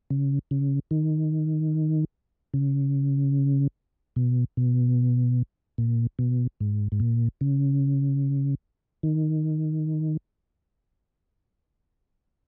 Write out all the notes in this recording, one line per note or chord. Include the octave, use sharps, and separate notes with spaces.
C#3
C#3
D#3
C#3
B2
B2
A#2
B2
G#2
G#2
A#2
C#3
D#3